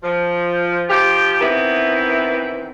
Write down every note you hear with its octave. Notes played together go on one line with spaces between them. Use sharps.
F3
F3 G4
D#3 E3 B3 C4 E4